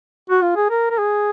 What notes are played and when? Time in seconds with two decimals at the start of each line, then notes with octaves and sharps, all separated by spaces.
0.30 F#4
0.42 F4
0.56 G#4
0.70 A#4
0.90 A#4
0.98 G#4